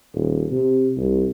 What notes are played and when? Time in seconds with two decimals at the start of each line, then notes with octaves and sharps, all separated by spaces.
0.15 D#1
0.52 C3
0.97 C2